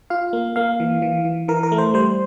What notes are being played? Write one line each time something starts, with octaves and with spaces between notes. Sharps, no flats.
F4 F5
A#3
A#3 F5
E3
E3
E3
E3 A#4
A#4
A3
C5
G3 C5